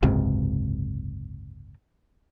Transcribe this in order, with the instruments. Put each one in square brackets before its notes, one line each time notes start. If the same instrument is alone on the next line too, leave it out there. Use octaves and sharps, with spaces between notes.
[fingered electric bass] F#1 C#2 G#2 C3